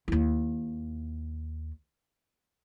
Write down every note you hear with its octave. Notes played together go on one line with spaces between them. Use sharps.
D#2 E4